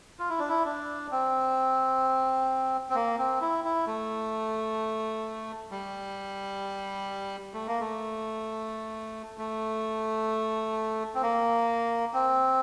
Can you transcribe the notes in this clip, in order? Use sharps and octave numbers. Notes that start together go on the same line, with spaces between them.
F4
E4
D4
E4
D4
C4
C4
A#3
C4
E4
E4
A3
G3
A3
A#3
A3
A3
C4
A#3
C4